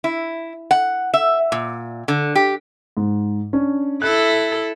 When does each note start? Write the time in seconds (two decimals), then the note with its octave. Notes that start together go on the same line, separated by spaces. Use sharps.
0.04 E4
0.71 F#5
1.14 E5
1.52 A#2
2.08 D3
2.35 G4
2.97 G#2
3.53 C#4 D4
4.02 E4 A4 F#6